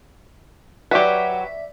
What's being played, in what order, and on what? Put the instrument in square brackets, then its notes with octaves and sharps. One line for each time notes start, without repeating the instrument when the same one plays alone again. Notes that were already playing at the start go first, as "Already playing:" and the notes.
[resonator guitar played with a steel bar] F#3 F#4 [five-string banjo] G4 B4 [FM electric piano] D5 E5 B6